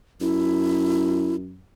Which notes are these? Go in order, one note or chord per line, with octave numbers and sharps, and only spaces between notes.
F#2 E4